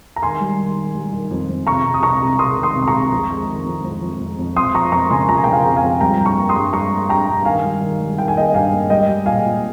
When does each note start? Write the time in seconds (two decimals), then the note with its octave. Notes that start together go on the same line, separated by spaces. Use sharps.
0.16 A#5
0.22 D#3 G#5 C6
0.41 G3
0.59 D#3
0.76 D#3
0.95 G3
1.12 D#3
1.31 F2
1.49 F2
1.67 C3 A#5 C#6
1.85 C3
1.94 D#6
2.03 C2 A#5 C#6
2.21 C2
2.39 C3 C6 D#6
2.58 D#3
2.63 C6 D#6
2.75 C3
2.82 C6
2.87 A#5 C#6
2.94 C2
3.12 F2
3.30 G#3
3.48 D#3
3.66 F2
3.84 F2
4.02 F2
4.21 F2
4.39 F2
4.56 F2 C6 D#6
4.74 F3 A#5 C#6
4.92 F2 A#5 C#6
5.10 C#3 G#5 C6
5.29 F3 A#5
5.37 G#5
5.44 G5 A#5
5.47 C#3
5.52 F5 G#5
5.64 F2
5.76 F5 G#5
5.83 F2
6.01 G3 G5 A#5
6.20 G2
6.25 A#5 C#6
6.37 A#3
6.49 C6 D#6
6.56 G2
6.73 G3 A#5 C#6
6.92 A#3
7.09 G2 G5 A#5
7.28 G2
7.45 D#3 F5 G#5
7.64 G3
7.81 D#3
8.00 G3
8.18 D#3 G5
8.28 G#5
8.36 A#3 D#5 G5
8.54 G2 F5 G#5
8.73 A#3
8.90 G3 D#5 G5
9.08 G3
9.26 A#2 F5 G#5
9.45 A#2